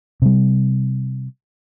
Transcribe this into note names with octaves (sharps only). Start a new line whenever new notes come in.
C3 G3